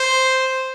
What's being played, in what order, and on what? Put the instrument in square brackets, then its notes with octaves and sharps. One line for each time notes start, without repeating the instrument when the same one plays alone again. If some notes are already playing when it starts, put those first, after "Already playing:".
Already playing: [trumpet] C5